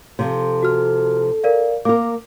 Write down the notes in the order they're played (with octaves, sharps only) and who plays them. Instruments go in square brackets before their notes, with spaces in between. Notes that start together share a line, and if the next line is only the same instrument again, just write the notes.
[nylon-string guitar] C3 F3 [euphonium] A4
[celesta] F#4 F6
A#4 D5 F5
[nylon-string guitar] A#3 A#4 [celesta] D6